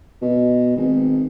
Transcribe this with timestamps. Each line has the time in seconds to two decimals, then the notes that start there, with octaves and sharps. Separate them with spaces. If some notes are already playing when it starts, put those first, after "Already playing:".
0.22 B2
0.77 G#1